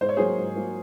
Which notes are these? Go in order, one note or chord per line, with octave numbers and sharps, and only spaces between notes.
G#2 C5
C#5
F#3 A#3 G#4 C5
G#2
F#3 A#3